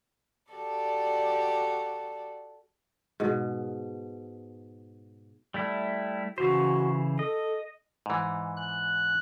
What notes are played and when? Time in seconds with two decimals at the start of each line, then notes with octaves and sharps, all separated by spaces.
0.52 F#4 G4 A4 D5
3.20 G#2 B2
5.54 G3 A3 E4
6.38 C#3 E3 F#4 C5
7.19 A4 D#5
8.06 G#2 E3
8.56 F#6